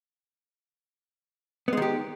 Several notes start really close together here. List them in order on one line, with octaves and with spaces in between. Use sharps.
B3 G#3 D#3 G4